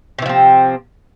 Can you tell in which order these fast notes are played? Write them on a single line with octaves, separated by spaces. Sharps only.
C3 E3 F3 C4